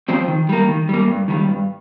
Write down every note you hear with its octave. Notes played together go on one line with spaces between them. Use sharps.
F3 C4 G4 C5
D#3
G3 A#3
D#3
G3 A#3
G2
D#3 G3
G2